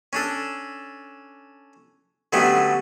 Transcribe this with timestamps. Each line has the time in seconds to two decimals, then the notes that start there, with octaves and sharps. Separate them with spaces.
0.13 C#4 D4 A4
2.33 D3 F#3 G3 A3 B3 C#4